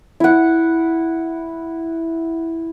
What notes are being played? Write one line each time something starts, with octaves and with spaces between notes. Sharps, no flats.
E4 F#5